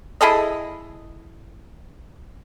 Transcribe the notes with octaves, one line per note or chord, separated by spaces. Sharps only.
E4 G#4 A4 D#5